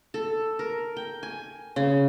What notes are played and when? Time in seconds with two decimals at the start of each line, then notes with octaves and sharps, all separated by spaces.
0.14 A4
0.59 A#4
0.97 G5
1.23 G#5
1.76 C#3